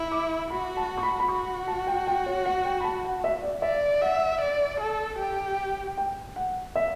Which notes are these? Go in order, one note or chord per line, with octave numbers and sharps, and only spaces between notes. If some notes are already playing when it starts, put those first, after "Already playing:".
Already playing: E4
D6
F#4 B5
A5
C#6
B5
B5
F#4 C#6
A5
G5
G5
C#5
F#5
G5
B5
A5
F#5
E5
D5
D5 E5
E5 F#5
D5
A4
G4
G5
F#5
E5